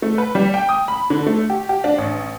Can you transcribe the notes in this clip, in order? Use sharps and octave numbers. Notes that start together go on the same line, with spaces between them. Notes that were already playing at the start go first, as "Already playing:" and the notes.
A3
B4
G3
G5
D#6
B5
D3
A3
G4
G4
D4
A1